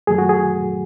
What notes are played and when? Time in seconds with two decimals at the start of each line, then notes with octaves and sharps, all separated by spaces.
0.07 F#2 D#3 F#3 A3 G#4
0.18 F#4
0.29 G#4